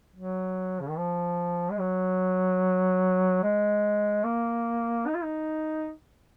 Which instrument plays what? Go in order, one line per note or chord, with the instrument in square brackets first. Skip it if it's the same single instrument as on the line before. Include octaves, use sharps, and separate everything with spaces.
[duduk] F#3
C#3
D#3
F3
G#3
F#3
G#3
A#3
D#4
F4
D#4